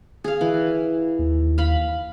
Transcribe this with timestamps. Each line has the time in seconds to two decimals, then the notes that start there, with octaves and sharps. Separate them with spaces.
0.24 G#4 F5
0.41 E3
1.19 D#2
1.58 F5 B5